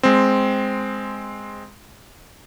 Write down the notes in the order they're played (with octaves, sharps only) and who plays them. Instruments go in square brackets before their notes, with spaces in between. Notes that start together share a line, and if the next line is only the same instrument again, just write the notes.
[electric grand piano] G#3 C4